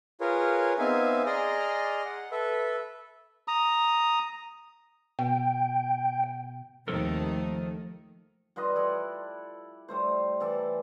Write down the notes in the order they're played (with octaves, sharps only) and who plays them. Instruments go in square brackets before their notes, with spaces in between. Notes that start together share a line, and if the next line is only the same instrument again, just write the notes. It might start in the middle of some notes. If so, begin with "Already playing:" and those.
[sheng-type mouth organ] F4 G#4 A#4 B4 C#5
B3 C4 D#4 E5 F5 G#5
G#4 D5 D#5 A#5 C6 F6
F#5
A4 B4 E5
[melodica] A#5 D#6
[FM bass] B2 [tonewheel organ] G5
[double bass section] D#2 C3 [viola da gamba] D#3 A3 [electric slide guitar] F3 A4 A#4
[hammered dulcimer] G3 F4 B4 D#5
E4 A4 D5
G3 A3 C5
E3 A4 D5